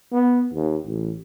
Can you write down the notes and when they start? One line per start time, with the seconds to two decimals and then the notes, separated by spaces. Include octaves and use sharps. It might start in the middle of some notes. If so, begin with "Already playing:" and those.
0.12 B3
0.54 D#2
0.86 A1